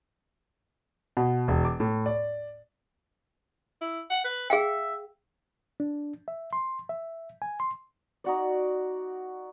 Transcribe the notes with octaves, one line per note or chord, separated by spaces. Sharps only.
B2
E1
D6
A2
D5
E4
F#5
B4
G#4 E5 F5 G5
D4
E5
C6
E5
G#5
C6
D#4 F#4 D5